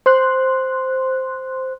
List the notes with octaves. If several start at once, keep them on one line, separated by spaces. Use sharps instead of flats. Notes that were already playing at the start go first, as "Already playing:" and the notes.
C5 C6 F#6